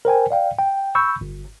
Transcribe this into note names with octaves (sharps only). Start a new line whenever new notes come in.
A#4 C5 G5 G#5
D5 F5 G5
G5
B5 C#6 E6 G6
G1